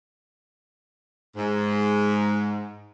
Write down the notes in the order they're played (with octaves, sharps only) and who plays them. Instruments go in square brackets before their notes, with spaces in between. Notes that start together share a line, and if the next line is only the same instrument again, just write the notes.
[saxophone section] G#2